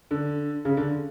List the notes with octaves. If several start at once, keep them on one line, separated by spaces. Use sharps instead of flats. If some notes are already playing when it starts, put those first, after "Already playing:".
D3
C#3
D3